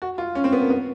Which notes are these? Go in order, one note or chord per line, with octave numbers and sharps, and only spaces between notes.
F#4
F4
C#4
C4
B3
A#3
B3